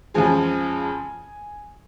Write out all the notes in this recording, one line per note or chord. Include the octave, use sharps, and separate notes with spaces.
F2 C#3 F3 G#3 G#5